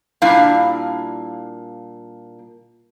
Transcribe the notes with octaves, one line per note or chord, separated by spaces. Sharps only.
A#2 G3 D4 E4 F5